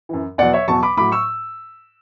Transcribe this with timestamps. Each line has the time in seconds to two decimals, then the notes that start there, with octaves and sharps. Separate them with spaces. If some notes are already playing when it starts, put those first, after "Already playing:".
0.09 F#2 E3
0.38 E2 B2 F#3 D5 F#5
0.53 C#5 E5
0.68 E2 B2 F#3 A5 C#6
0.82 B5 D6
0.97 A2 F#3 B5 D6
1.12 C#6 E6